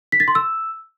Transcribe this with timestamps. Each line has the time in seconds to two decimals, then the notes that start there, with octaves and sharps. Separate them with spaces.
0.12 B6
0.20 A6
0.28 C6
0.35 E6